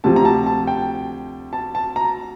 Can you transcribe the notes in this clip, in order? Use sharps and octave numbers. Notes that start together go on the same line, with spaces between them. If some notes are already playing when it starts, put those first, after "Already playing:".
D2 C3 F3 A5
A#5
A5
A5
G5
A5
A5
A#5